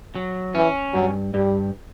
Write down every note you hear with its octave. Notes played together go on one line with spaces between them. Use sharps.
F#3
E3 C#4
G2 F#3
G2 G3